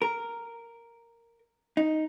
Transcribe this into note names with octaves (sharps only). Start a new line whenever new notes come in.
A#4
D#4